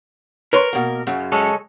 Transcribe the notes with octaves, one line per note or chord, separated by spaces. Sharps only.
A#4 B4 C#5 C6
B2 A#3
F#2 C#3 F#3
G#3 A4 C#5